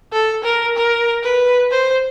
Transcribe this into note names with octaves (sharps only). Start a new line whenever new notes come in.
A4
A#4
A#4
B4
C5